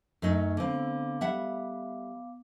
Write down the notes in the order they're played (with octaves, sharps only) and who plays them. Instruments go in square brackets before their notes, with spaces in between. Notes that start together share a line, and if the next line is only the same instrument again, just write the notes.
[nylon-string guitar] F#2 A3 D#4
[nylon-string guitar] D3 C4 [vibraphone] B3 F5 D6
[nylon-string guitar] G3 E5 F#5